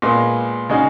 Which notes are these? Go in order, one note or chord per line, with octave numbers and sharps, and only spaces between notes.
A#2 G#3 B3
C#3 G#3 D#4 F#4